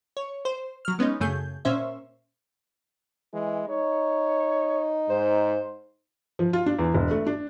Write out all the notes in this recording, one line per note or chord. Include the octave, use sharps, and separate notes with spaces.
C#5
C5
F#3 F6
G#3 B3 C#4 D#4
F#2 C#3 A3 G#4 G6
A#2 C#4 C5 E5
E3 G#3
D#4 C#5
G#2 C5
F3
F4
D4
E2
E1
A3
D4